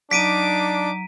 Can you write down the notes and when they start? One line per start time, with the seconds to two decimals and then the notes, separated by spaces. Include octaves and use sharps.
0.11 F#3 D4 D#4 A#5 D6 B6 D7 D#7